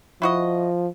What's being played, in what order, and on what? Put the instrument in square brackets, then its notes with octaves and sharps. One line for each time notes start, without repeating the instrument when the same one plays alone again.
[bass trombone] F3 [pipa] E4 F#4 D#5